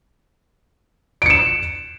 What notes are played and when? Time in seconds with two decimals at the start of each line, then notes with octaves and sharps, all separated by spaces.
1.22 D7
1.26 C#7
1.30 E7